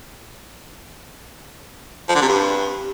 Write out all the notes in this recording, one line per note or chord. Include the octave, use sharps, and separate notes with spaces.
F3
D3
C3
G2